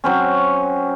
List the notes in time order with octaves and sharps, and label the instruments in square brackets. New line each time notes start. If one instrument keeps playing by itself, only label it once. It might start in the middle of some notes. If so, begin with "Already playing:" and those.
[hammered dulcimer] F#3 C4 C#4